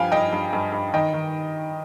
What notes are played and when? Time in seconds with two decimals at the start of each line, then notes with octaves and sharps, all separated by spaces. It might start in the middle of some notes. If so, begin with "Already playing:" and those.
Already playing: G2 F3 F5 G5 G#5
0.12 G2 D#5 G5
0.33 G2
0.53 G2
0.72 G2
0.94 D#3 D#5 G5
1.14 D#3